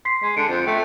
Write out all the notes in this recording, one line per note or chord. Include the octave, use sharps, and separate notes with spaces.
C6 B6 C7
G#3
D3 C#7 D7
F2
A3 G5